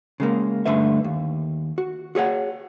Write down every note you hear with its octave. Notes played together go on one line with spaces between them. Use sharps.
C#3 G#3 A#3
G2 D3 A3 B4 E5
D#2
F#4
F#4 G#4 C#5 F#5